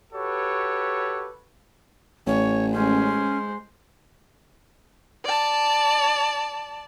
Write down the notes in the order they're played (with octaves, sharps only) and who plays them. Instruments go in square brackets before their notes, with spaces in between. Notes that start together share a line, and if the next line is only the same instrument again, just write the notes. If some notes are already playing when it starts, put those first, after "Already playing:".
[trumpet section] F#4 G4 A4 B4 C#5
[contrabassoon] A1 [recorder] C#5
[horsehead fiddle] G#3 C5 [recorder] C#4
[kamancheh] D5 A5